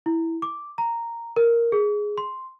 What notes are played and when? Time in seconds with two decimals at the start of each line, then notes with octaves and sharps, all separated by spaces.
0.06 E4
0.42 D6
0.78 A#5
1.36 A#4
1.72 G#4
2.18 C6